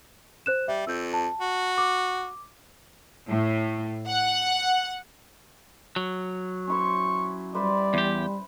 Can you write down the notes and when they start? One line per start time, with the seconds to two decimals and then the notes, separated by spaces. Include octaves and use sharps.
0.46 C5 F#6 E7
0.68 G3 E5
0.87 F2 E6 G6
1.14 A5
1.40 F#4
1.78 D6
3.29 A2
4.08 F#5
5.96 F#3
6.67 C#4 E4 C5 C#6
7.55 G3 B4 C5 D5 E5
7.94 E2 G4